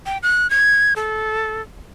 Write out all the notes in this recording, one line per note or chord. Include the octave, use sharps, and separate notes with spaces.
G5
F#6
G#6
A4